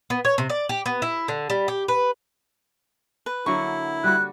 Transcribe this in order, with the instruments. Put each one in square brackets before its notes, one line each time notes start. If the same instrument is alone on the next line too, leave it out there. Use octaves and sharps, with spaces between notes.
[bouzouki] B3
C#5
C3
D5
G4
B3
E4
D3
G3
G4
B4
[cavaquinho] B4
[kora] D3 F#3 A#3 [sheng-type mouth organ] E4 [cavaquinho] C#6
[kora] G3 F#4 [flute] F#6